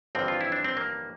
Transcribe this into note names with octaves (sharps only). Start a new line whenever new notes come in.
A1 G2 D3 F3 C4
F4
E4
D4
C4
A#3